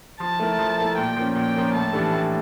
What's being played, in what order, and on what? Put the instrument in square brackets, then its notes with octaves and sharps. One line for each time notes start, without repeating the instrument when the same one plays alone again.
[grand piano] F3 [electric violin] A5
[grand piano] A3 E4 A#4
F3
A3 E4 A#4
[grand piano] A#2 [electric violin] G5
[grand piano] F3 A#3 C#4
[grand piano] A#2 [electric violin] G5
[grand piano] F3 A#3 C#4
[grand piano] A2 [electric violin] A5
[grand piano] E3 G3 D4 A4
A2